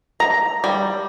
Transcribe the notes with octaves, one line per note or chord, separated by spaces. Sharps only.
A#5
G3